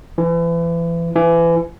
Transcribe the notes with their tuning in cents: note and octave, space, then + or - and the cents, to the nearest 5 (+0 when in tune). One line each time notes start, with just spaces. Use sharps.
E3 +35
E3 +30